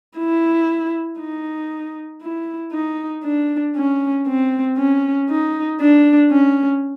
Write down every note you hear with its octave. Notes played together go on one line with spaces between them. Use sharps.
E4
D#4
E4
D#4
D4
C#4
C4
C#4
D#4
D4
C#4